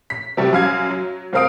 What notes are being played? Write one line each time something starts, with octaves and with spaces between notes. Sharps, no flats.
B6
C3 G3 F#4
F#2 F5 G#6
F#3
C2 C4 A#4 F5 D#6 D7